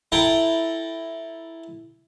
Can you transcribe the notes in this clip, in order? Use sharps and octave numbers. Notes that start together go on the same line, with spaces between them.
E4 A4 G5 A#5